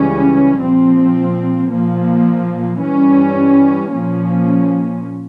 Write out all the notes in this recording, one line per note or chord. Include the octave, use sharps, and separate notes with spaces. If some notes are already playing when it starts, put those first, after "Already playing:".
Already playing: C#2 C#3 E3 G3 C#4
A#2 F3 C4
A#2 F3 A#3
G2 E3 G3 C#4
A#2 F3 A#3 C#4